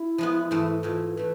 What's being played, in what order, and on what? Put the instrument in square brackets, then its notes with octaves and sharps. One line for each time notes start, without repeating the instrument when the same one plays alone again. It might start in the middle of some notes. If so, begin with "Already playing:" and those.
Already playing: [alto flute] E4
[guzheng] F3 G#3 B3
G#2 E3 A3
[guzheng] G#2 E3 A3 [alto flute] F4
[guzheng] E3 A3 [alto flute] B4